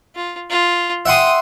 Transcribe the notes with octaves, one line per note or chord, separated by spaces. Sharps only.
F4
F4
E5 F#5 G5 C6 D#6